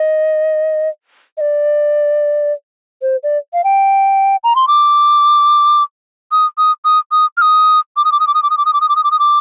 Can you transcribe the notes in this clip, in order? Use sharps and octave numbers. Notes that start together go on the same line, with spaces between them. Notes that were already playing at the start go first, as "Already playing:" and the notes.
Already playing: D#5
D#5
D5
C5
D5
F5
G5
A#5
C6
D6
D#6
D#6
D#6
D#6
F6
D#6
D6
D#6
D6
D#6
D6
D#6
D6
D#6
D6
D#6
D6
D#6
D6
D#6
D6
D#6
D6